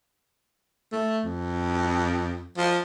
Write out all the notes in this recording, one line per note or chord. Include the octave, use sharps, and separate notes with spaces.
A3
F2
F3